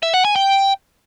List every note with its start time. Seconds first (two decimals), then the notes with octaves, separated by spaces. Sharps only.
0.03 E5
0.14 F#5
0.25 G#5
0.36 G5